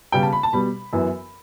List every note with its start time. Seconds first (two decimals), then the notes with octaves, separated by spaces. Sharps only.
0.12 C#3 G3 B3 G5
0.22 A5
0.33 B5
0.43 A5
0.53 B2 G3 B3 B5
0.93 F#2 E3 B3